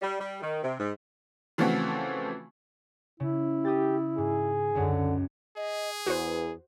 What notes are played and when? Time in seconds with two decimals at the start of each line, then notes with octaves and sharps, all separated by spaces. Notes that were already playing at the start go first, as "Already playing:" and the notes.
0.01 G3
0.20 G3
0.42 D#3
0.63 C3
0.79 G#2
1.58 C#3 E3 F3 A3 C4 F#4
3.20 C#3 E4
3.65 G4 D#6 G6 A6
4.18 G#2 G#4
4.75 C#2 F#2 D3
5.57 G#4 D#5
6.07 E2 F#4 B4 C5